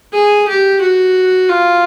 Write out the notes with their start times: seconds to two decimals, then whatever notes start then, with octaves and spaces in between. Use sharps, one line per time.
0.13 G#4
0.48 G4
0.81 F#4
1.49 F4